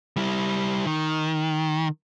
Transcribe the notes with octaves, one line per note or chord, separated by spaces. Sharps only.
G3 E4
D#3